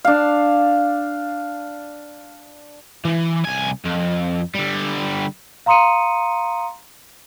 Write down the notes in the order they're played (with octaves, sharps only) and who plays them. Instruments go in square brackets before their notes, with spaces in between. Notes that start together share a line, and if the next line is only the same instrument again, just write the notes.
[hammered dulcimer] D4 F5
[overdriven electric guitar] E3
C2 G#5
F2
D3 G3
[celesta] F5 A#5 C6 D#6 C#7 D#7